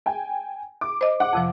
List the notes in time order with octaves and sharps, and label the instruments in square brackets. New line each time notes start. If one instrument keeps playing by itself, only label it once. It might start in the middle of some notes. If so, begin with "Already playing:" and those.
[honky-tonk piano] G5 G#5
D6
[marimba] C5 D#5
[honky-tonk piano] F#5 D6
[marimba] F2 C3 F3